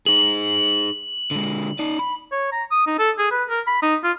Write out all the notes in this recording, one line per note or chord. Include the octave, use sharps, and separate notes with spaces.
D#4 G#4 F#7
D3 G#3
D#4 D5
B5
C#5
A#5
D#6
D#4
A4
G#4
B4
A#4
B5
D#4
F4